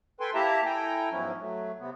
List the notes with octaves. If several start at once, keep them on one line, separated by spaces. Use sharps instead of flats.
A4 B4 G5 G#5 C6
A#3 E4 G4 E5 A5 A#5
E4 A4 G5 G#5 A#5
G#2 B2 F3 F#3 C#4 E4
F#3 A3
C3 B3